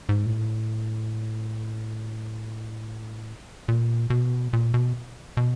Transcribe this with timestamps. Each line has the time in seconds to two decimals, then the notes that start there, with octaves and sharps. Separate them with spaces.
0.09 G#2
0.26 A#2
0.30 A2
3.68 A#2
4.10 B2
4.53 A#2
4.74 B2
5.37 B2